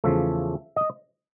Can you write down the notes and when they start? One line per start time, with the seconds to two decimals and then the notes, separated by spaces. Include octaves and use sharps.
0.04 E2 C#3 F3 A3 E5
0.76 D#5